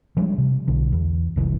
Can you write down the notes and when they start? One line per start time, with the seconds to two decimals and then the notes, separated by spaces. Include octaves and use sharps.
0.17 F3 G3 G#3 D4
0.38 C3
0.68 B1 D3
0.93 E2
1.36 F1 C2 A#2 E3